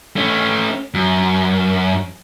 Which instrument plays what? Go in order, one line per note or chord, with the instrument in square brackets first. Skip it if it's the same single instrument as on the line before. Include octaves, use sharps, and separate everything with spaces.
[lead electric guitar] A3 C#4
F#2